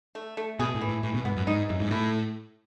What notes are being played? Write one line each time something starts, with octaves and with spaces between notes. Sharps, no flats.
A3
A3
B2 G#4
A2
E3
A2
A2 E3
B2
G#2 B3
F#2
G#2 D#4
F#2 E3
G#2
A2 E4